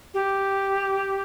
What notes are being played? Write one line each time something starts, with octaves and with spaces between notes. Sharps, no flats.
G4